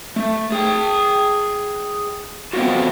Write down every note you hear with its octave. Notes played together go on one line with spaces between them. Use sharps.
A3
G#4 G5
A3 B3 C4 F4 F#4